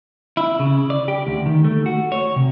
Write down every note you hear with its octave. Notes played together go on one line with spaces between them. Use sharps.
E4
C#3
D5
G4
D2
D#3
A3
F#4
C#5
C3